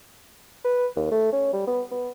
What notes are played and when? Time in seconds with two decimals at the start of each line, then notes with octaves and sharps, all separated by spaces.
0.64 B4
0.96 D#2
1.12 A3
1.33 C#4
1.53 G3
1.67 B3
1.91 B3